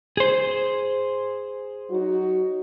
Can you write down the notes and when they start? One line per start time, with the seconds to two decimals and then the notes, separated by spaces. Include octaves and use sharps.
0.17 G#4 C5
1.91 F#3 D#4 F#4